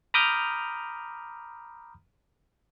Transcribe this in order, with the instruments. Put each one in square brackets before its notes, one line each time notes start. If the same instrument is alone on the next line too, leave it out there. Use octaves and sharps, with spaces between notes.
[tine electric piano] A#5 B5 D6 D#6 F6 G6